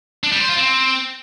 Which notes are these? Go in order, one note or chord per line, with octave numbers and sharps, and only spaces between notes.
D4
G3
C5
F4
C4